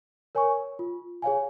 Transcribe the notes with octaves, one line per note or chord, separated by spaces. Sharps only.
A#4 C#5 G#5 C#6
F4
G#4 C#5 F5 G#5